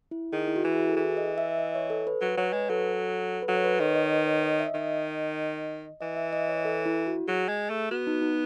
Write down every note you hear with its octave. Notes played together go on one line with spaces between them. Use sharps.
E4
D#3 G#4
E4
F#4
E3 E4
G#4
F#4
A4
E3 G#4
D#5
E5
D#5
C#5
A4
B4
F#3 B4
F#3 C#5
G#3 B4
F#3 A4
B4
F#3 A4
C#5
B4
D#3 C#5
D#5
B4
C#5
D#5
E5
D#3 D#5
E3 D#5
E5
D#5
C#5
A4
E4
F#4
F#3 G#4
G#3
A3
B3 F#4
D#4
D#4